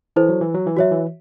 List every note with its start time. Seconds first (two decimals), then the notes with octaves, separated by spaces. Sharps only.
0.16 E3 E4 A4 C5
0.29 F#3
0.41 E3
0.54 F#3
0.66 E3
0.77 F#3 F#4 C#5 E5
0.91 E3